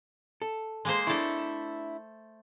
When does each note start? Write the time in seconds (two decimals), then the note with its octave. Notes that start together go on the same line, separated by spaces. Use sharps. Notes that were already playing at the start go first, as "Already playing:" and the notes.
0.42 A4
0.85 G#3 A#3 C5
1.07 A3 D4 E4 A4